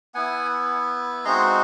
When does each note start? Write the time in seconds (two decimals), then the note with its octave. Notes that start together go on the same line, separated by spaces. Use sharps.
0.14 B3 E4 F#5 G#5
1.25 G#3 C4 D#4 F#4 A#5 C6